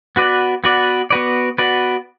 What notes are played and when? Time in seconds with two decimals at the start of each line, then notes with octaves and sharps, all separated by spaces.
0.16 B3 F#4 B4 D5
0.64 B3 F#4 B4 D5
1.10 B3 F#4 B4 D5
1.58 B3 F#4 B4 D5